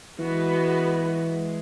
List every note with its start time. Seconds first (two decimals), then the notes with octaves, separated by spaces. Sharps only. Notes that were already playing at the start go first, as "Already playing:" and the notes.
0.19 E3 G#3 B3 F#4 B4
1.31 G#3